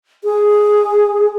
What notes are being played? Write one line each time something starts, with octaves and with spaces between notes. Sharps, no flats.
G#4